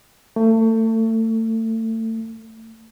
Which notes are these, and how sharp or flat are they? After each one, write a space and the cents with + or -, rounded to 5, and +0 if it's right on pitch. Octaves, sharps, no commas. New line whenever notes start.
A3 +30